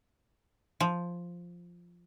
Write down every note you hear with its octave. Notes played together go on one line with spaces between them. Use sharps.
F3